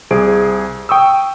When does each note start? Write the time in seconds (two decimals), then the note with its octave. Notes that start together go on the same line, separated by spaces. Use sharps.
0.11 C2 G#4 C5 D7
0.89 G5 C#6 D#6 E6